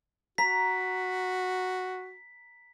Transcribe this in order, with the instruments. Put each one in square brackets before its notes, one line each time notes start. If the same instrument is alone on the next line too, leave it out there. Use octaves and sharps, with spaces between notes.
[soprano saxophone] F#4 [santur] A#5 [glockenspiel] B6